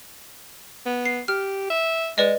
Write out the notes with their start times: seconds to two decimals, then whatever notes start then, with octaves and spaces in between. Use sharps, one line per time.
0.86 B3
1.05 C7
1.28 G4 F6
1.70 E5
2.18 G#3 B4 D5 D#5